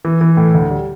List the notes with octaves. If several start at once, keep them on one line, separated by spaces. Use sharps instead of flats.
E3
E3
A2
D2
G3